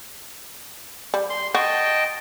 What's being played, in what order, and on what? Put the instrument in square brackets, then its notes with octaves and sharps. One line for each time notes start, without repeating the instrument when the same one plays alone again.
[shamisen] G3
[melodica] C6
[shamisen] F#4 [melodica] D#5 G5 A5